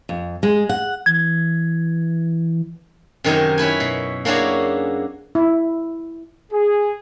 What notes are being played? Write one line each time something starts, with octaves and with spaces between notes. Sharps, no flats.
F2
G#3
F#5
E3 G#6
F#2 C3 D#3 D#4 A#4 G#5
C#4 E4 B4 G#5
B2
A#3 C#4 D4 E4 F#4 G#4
E4
G#4